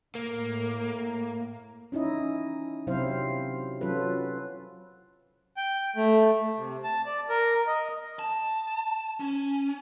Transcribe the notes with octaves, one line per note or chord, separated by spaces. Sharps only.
A2 A#3
C#4 D#4 E4 D#5
C3 F#3 C4 E4 C5 F5
F#3 C#4 F4 A4 B4
G5
A3
C3
A5
D5
A#4
D#5
A5
C#4